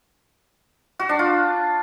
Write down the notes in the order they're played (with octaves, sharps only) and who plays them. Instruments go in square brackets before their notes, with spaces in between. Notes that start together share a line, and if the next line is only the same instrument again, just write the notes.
[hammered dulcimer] F#4
D4
F4